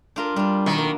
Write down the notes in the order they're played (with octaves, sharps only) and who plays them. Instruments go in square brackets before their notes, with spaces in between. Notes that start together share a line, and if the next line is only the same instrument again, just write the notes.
[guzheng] D4 F4 A#4
[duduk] G3 [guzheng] D4 F4
[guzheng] B2 F#3 [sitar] D#3
[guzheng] A#3